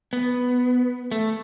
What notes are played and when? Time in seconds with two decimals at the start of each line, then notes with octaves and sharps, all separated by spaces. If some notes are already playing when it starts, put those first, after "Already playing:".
0.13 B3
1.12 A3